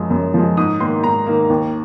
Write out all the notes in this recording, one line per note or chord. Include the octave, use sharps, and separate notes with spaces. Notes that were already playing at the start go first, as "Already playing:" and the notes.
Already playing: F#2 F3 G#3
F#2
F3 G#3
G#2 D#6
D#3 A#3 C6
G#2 A#5
D#3 A#3
D#2